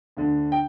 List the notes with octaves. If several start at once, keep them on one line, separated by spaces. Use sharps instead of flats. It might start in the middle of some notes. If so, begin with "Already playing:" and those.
D2 D3
G5